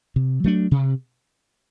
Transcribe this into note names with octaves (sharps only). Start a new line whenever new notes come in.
C3
F#3 A3 D4
C3